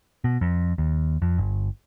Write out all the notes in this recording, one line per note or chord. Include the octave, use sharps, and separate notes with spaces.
B2
F2
D#2
F2
G1